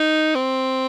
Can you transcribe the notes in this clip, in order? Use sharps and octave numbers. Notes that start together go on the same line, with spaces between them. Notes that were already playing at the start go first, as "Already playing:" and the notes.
Already playing: D#4
C4